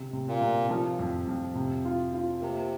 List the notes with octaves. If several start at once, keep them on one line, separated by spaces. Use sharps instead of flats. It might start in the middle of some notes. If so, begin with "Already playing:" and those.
Already playing: C3
C3
A#2
C3
F3
F2
F2
C3
F4
F4
C3 A#3